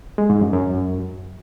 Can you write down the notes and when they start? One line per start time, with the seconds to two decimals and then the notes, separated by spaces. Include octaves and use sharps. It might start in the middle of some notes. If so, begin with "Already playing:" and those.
0.18 G#3
0.30 G#2
0.41 F#2
0.53 F#2